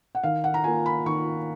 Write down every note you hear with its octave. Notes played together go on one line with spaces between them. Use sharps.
F#5
D#3 F5
F#5
A#5
A#3 F4 G#5
B5
D#3 C#6